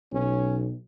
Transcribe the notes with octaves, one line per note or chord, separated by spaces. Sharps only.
B1 C#4